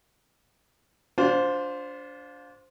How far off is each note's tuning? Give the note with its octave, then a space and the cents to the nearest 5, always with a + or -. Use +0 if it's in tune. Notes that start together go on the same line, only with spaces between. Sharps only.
D4 -25 F4 +25 C5 +0